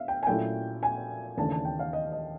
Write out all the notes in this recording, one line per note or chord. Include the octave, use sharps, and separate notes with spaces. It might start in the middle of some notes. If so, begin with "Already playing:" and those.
Already playing: E5 F5
G5
G#5
A#2 F#3 A3 C#4 E4 G5
G#5
D#2 C#3 E3 A3 D4 A5
A5
G5
F5
D#5
D#5